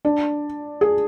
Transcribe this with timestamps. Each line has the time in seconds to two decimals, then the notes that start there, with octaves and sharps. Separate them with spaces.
0.05 D4
0.81 G#4